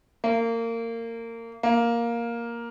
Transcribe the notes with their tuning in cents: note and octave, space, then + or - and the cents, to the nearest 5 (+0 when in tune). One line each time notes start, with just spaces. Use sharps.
A#3 -25
A#3 +5